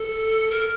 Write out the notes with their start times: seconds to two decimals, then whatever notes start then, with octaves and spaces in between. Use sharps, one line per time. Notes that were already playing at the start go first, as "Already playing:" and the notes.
Already playing: A4
0.51 A#4